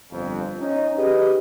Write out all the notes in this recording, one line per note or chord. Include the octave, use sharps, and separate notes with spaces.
G1 F2
C#4 D#4
G4 G#4 B4 D#5